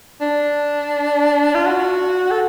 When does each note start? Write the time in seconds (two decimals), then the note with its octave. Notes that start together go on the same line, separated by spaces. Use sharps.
0.21 D4
1.55 F4
1.66 F#4
2.31 A4